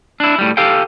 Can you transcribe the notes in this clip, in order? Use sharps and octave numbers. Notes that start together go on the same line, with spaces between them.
D4 E4
A2 G3
G4 A4 F5 G5